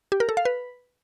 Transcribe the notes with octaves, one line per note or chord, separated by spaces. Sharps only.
G4
A#4
A4
F5
B4